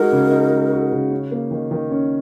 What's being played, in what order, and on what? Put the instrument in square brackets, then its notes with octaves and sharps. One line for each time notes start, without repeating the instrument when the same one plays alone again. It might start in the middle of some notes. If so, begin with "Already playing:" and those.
Already playing: [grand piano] G#3 D#4 F#4 [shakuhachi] A#4
[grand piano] C#3
D#4
G#3
F#4
C#3
C#4
A#3
D#3
D#3
C#4